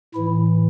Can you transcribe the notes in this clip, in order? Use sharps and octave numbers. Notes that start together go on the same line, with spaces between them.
A2 E3 E4